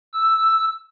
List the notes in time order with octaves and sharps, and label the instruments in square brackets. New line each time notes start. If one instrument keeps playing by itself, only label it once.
[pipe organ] E6